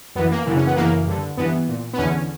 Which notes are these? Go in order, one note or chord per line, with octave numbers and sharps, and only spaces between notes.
F#2 E3 B3
A#3
F#2 C#3 E3
C#4
B3
F#2 C#3 E3 A#3
G2 D3
G2 E3 B3
A#2
B3
E2 D3 C#4